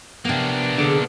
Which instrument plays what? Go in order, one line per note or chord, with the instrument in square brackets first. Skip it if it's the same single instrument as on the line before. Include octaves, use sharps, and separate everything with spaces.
[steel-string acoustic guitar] C3 B3 [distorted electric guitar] A#3 D4
[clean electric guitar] D3 [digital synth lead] G#4